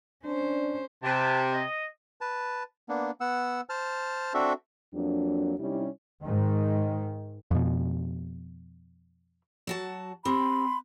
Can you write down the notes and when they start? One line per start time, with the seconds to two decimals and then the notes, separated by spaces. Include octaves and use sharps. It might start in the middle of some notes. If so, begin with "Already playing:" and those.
0.24 C#4 D4 C5
1.03 C3 B4 A5
1.52 D#5
2.21 B4 A5
2.89 A#3 B3 D4
3.21 B3 F#5 E6
3.69 C5 A5 F6
4.34 C4 D4 F#4 A4 E5
4.93 F2 F#3 A#3 D4
5.59 C3 G3 C#4 D#4 E4 G4
6.24 G#2 D#3
7.51 F2 B2
9.67 F#3 F#4 A5
10.25 C4 G4 B5 C6